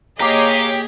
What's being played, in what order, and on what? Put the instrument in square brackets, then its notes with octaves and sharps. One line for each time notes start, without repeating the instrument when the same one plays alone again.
[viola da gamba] A#3 G#4 [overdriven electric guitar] G4 [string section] C#5 D#5 F5 [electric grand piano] A#5 D6